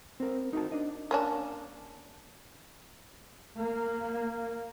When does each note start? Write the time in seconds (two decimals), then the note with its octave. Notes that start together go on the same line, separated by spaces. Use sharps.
0.20 C4 A#4
0.53 D#4 F#4 G#4 A#4 A5
0.72 D4 D#5
1.11 A#3 C#4 D4
3.57 A#3